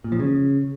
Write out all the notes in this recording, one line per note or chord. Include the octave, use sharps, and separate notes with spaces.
A#2
F3
C#3